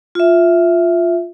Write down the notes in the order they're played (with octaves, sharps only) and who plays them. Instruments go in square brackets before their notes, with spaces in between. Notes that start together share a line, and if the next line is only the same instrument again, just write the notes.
[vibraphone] F4 E5